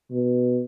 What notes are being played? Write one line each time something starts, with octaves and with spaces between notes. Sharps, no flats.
B2